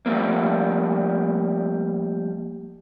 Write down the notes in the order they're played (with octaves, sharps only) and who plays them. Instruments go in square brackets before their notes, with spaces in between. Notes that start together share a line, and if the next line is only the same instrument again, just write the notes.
[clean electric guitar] F3 G3 A3 A#3